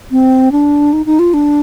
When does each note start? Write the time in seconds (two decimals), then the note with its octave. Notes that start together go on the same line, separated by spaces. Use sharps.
0.11 C4
0.52 D4
0.93 D#4
1.06 D#4
1.19 F4
1.34 D4